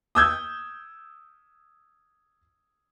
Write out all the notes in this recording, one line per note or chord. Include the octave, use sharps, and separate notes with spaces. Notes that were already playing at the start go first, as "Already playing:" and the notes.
D#6 E6 G6 G#6